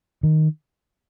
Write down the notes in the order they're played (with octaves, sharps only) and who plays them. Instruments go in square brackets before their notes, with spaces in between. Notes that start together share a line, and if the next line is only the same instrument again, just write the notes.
[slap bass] D#3